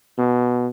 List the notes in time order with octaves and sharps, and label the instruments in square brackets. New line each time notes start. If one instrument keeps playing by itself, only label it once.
[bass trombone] B2